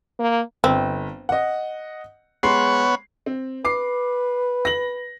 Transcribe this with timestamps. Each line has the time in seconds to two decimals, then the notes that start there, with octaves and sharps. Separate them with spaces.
0.19 A#3
0.64 G1 C4
1.29 D#5 F#5
2.43 G#3 B3 C#5 F#5 C6 C7
3.26 C4
3.65 B4 D6 C7
4.65 A#6 F#7